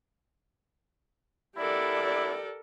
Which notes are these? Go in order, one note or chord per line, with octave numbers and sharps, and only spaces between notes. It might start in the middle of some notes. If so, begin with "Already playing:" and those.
B3 D4 E4 G4 A4 A#4 D5